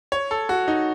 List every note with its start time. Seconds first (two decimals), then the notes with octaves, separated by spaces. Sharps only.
0.12 C#5
0.31 A4
0.49 F#4
0.68 D#4